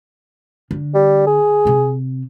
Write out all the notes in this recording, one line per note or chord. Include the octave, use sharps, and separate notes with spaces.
D3
G3
G#4
C3 C4